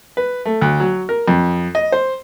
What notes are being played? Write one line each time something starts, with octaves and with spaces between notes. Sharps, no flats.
B4
A3
D2
F#3
A#4
F2
D#5
C5